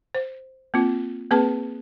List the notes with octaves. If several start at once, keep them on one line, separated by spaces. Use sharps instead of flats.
C5
A#3 C4 F4
A#3 C4 G#4 B4 A5